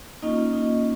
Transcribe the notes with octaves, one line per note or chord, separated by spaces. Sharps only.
A#3 C#4 D#4 F4 D#5
D#4 D#5